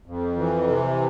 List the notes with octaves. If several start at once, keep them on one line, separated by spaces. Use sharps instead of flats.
F2
E3
C3